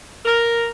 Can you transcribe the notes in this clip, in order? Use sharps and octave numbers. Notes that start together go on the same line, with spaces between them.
A#4